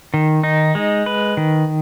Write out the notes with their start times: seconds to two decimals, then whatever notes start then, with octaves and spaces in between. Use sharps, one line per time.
0.14 D#3
0.43 D#4
0.75 G#3
1.06 B4
1.37 D#3